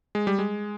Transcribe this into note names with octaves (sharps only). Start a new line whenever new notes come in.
G#3
G3
G#3